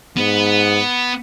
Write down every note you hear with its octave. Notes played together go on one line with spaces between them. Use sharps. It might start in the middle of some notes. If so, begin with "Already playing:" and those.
G#2 B3